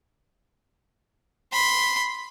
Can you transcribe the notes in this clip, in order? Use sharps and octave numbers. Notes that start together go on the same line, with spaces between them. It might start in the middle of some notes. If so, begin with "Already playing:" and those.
B5 C6